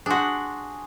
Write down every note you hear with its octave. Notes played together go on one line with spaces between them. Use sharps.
D4 F#4 G#4 C6